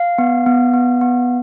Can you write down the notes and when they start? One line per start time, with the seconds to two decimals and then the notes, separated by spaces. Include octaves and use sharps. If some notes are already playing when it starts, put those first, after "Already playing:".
Already playing: F5
0.18 B3
0.46 B3
0.73 B3
1.01 B3